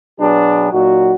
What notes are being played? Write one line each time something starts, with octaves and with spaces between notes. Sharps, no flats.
B2 F#3 D4 G#4 B4
A#2 F#3 D#4 F#4